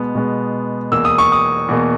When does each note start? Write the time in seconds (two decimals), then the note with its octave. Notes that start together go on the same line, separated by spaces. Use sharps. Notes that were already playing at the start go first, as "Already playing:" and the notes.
Already playing: B2 G#3 B3
0.15 B2 G#3 B3
0.92 E2 B2 A#3 E6
1.05 D#6
1.18 C#6
1.32 D#6
1.68 E2 B2 A#3